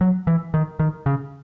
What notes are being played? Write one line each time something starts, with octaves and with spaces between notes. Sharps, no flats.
F#3
E3
D#3
D#3
C#3